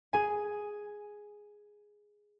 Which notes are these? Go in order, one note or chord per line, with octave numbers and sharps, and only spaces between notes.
G#4 G#5